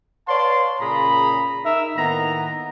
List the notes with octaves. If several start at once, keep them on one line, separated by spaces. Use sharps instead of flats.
B4 C#5 D5 F5 A5 C6
A#2 C#3 G#4 A#5 B5
D#4 A#4 E5
A2 D#3 A#3 B3 A#5